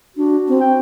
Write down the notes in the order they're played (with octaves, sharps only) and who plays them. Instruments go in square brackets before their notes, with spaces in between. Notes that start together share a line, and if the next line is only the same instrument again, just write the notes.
[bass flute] D4 [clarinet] F#4
[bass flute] C4
[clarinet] G5